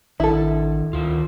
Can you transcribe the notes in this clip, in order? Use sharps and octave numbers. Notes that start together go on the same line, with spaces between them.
A1 D#3 D4 E4 A4
D2 D#3 F4